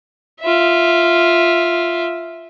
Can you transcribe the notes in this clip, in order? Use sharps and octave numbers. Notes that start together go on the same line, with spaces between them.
F4 E5